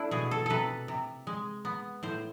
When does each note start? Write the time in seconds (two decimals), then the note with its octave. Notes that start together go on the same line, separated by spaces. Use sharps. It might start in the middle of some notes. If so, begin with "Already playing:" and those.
Already playing: A3 D4 E4
0.11 B2 G#4
0.31 A4
0.46 C3 A4 B4
0.88 C3
1.27 G#3
1.65 B3
2.03 A2 C5